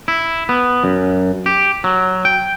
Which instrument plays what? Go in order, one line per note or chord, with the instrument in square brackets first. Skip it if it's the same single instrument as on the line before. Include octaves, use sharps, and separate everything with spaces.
[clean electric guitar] E4
B3
F#2
G4
F#3
G5